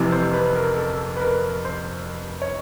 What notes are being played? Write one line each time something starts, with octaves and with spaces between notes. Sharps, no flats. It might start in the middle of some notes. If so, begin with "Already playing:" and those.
Already playing: F1 F2 C3 E3
C5
B4
A#4
A4
B4
A#4
C5
C#5